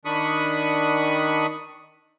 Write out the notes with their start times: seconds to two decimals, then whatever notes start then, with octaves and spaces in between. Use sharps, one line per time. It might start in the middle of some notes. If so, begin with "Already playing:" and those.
0.05 D#3 D4 B5 C#6 D#6